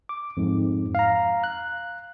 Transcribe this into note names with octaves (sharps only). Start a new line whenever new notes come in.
D6
F2 G#2
F5 A#5
F#6